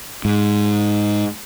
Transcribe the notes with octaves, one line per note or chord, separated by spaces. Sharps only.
G#2